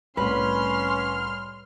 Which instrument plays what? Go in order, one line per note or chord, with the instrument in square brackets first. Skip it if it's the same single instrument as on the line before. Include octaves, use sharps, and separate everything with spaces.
[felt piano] C2 A2 [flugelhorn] C#4 [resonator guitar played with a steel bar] B4 [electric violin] C6 F6